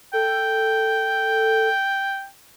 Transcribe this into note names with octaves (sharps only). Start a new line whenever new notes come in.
A4 G5